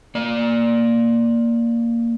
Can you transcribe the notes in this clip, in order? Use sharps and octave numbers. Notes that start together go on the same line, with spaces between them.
A#3 D5